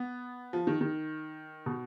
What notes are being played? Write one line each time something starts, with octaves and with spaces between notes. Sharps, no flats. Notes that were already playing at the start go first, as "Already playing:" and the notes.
Already playing: B3
F3
D#3
D#3
B2